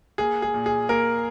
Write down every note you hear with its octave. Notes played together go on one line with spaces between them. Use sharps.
A#3 G#4
G#4
A#2
G#4
A#3 A#4